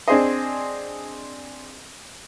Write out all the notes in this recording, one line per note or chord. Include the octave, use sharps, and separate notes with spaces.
C4 D4 G#4 C5 D#5